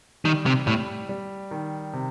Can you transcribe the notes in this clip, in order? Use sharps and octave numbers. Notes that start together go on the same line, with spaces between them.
D#3 G3
C3
A2 G3
G3
D#3
C3